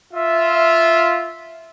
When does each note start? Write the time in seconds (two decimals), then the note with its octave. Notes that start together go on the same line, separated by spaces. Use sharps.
0.14 F4 E5